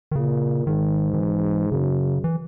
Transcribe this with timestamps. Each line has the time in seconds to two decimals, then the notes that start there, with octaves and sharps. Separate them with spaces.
0.11 D#3
0.15 A#2 C#3
0.67 G#2 D#3
1.14 D#3
1.19 E3
1.72 F#2 C#3
2.24 E3